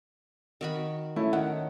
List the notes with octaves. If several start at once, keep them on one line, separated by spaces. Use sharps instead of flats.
D#3 F#4 B5
A3 C#4 E4
D#3 F#5